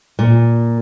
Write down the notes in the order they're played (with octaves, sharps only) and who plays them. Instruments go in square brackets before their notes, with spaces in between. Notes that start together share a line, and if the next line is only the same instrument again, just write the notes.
[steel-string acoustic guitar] A#2